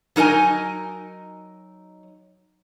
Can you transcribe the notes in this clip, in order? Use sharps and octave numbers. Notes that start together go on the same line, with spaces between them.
F#3 D#4 A#4 D#5 G#5